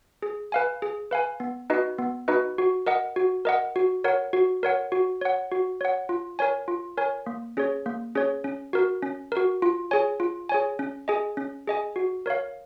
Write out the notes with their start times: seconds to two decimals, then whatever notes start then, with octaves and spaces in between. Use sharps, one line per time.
0.22 G#4
0.52 B4 F5 G#5
0.82 G#4
1.11 B4 F5 G#5
1.40 B3
1.70 D#4 F#4 B4 D#5
1.98 B3
2.28 D#4 F#4 B4 D#5
2.58 F#4
2.86 A#4 D#5 F#5
3.16 F#4
3.45 A#4 D#5 F#5
3.76 F#4
4.04 A#4 C#5 F#5
4.33 F#4
4.63 A#4 C#5 F#5
4.92 F#4
5.21 C#5 F#5
5.52 F#4
5.81 C#5 F#5
6.09 F4
6.39 A#4 C#5 G#5
6.68 F4
6.97 A#4 C#5 G#5
7.26 A#3
7.57 C#4 G#4 C#5
7.86 A#3
8.15 C#4 G#4 C#5
8.44 C#4
8.73 F#4 A#4
9.02 C#4
9.32 F#4 A#4
9.62 F4
9.91 G#4 C#5 G#5
10.20 F4
10.49 G#4 C#5 G#5
10.79 C#4
11.08 G#4 D#5 G#5
11.37 C#4
11.67 G#4 D#5 G#5
11.96 F#4
12.26 A#4 C#5 F5